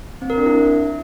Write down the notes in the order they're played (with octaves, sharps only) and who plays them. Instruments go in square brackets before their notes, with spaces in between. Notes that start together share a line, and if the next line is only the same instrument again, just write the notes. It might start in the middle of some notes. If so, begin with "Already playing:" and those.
[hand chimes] C4
A#4
D4
E4